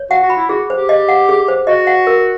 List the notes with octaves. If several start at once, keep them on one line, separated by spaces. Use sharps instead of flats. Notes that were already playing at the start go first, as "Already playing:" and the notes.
Already playing: C#5
F#4 F#5
F#4
B5
E4
F#4 G#4
C5
G4
D#5
F#5
G#4
C5
F#4 D#5
F#5
A#4